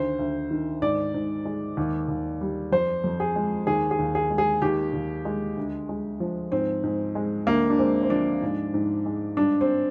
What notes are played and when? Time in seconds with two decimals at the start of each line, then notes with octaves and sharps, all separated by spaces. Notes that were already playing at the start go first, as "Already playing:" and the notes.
Already playing: D2 D#3 C5
0.19 D2
0.51 D#3
0.82 G#2 D5
1.14 G#2
1.45 G#3
1.77 D#2
2.08 D#2
2.41 G3
2.72 F2 C5
3.04 F2
3.20 G#4
3.36 G#3
3.67 D#2 G#4
3.91 G#4
3.99 D#2
4.15 G#4
4.31 G#3
4.38 G#4
4.62 D#2 G4
4.93 D#2
5.25 G#3
5.57 D2
5.89 G#3
6.20 F3
6.52 G#2 C4
6.83 G#2
7.15 G#3
7.47 D2 A#3
7.70 D4
7.79 G#3 C4
8.03 C4
8.10 F3 D4
8.42 G#2
8.74 G#2
9.06 G#3
9.37 G2 D4
9.61 C4